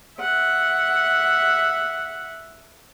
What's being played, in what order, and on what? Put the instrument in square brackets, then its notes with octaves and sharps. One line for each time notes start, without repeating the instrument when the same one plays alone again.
[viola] E5 F#5